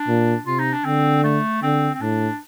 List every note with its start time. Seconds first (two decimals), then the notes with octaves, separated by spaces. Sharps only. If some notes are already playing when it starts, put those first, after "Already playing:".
Already playing: D4
0.08 A#2
0.46 C3 F4
0.59 D#4
0.73 D4
0.85 D3 C4
1.24 A3
1.63 D3 C4
1.94 C4
2.01 A2 D4